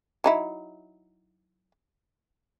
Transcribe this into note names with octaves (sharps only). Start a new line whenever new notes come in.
F#3 D#4 E4